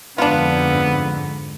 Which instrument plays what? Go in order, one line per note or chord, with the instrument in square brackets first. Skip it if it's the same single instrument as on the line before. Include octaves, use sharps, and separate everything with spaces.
[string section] F2 G#2 D3 [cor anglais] B3 [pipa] D4 F4